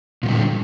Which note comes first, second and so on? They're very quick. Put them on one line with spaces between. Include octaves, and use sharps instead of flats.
A#2 F3 G3 D3